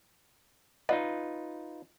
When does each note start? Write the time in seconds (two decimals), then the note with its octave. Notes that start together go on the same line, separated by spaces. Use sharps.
0.89 D#4 F4 B4 D5 D#5 F#5